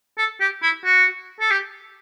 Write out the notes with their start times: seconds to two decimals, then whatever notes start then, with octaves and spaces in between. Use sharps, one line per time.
0.18 A4
0.40 G4
0.63 E4
0.85 F#4
1.40 A4
1.51 G4